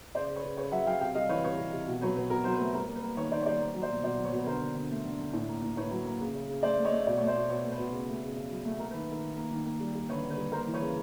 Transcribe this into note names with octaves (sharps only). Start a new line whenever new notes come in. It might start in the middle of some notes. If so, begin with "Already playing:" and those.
C#3 C5 D5
C#3
B4 C#5
C#3
C#3 B4 C#5
F#3 E5 F#5
F#3 F5 G5
C3 F5 G5
G3 D#5 F5
E3 B4 C#5
C3 B4 C#5
C3
C3
B2
F#3 B4 C#5
B2 B4
B2 A#4
F#3 C5
B4
A3
G3 A#4
A#3
B4
A#3
D#3 B4 C#5
D#3 C5 D5
C#5
G3 C5 D5
A#3
F#3
C5 D5
B2
B2 C5 D5
F#3
B4 C#5
B2
B4
D3 A#4 C5
D3
D3
A3
D3
D3
A2
A#3
A2
A2 B4 C#5
F#3
A#3
C#3
C#3
C#3
A3 C5 D5
A3
C#5 D#5
A3
B2 D5
A3 C#5
C5 D5
B2
B2 B4 C#5
A3
B4
B2
C#3
A3
C#3
C#3
F#3
A3
A#3 A#4
B4
D#3
D#3 A#4
D#3
A#3
D#3
A#3
G3
G3
D3 B4 C#5
D3
B4
G3
A#3 A#4 C5
E3
B4 C#5
C#3